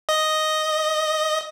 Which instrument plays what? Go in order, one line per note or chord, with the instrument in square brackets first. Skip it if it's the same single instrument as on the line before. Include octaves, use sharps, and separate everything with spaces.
[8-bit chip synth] D#5